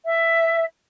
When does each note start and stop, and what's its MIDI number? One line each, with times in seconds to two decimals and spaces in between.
0.05 0.64 76